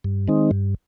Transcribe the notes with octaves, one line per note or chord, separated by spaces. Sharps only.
G2
D#3 G#3 C4 D#4
G2